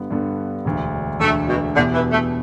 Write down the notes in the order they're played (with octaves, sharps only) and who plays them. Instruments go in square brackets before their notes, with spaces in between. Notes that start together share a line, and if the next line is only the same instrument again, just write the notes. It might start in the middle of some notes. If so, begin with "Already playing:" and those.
Already playing: [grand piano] G2 D3 B3
G2 D3 B3
E1 D2 D3
[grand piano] E1 D2 D3 [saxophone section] A3
[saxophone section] B2
[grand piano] E2 B2 B3 E4 G4 [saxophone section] D3
[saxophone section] E3
A3